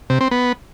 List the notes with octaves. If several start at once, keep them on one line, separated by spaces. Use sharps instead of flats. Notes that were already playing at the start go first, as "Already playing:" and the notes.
C3
C4
B3